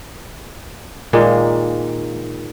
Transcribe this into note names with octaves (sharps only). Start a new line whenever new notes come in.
A#2 D#3 G#3 A#3